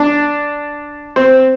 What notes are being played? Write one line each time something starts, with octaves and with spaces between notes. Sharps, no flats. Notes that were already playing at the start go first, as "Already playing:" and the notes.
Already playing: D4
C4